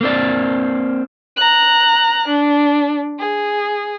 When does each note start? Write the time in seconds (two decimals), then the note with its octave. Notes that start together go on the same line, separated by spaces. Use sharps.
0.01 A#3 C4 D5
1.37 A#5 F#6
2.28 D4
3.19 G#4